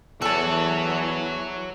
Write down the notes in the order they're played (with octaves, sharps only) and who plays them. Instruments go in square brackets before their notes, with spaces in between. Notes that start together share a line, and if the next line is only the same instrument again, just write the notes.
[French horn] E2 [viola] E3 [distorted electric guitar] F#4 C#5 [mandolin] A4 A5